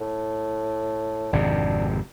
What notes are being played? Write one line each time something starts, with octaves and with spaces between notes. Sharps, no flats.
A2
G#1 F2 C3 D4